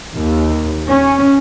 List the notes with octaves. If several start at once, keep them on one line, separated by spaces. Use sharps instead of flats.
D#2
C#4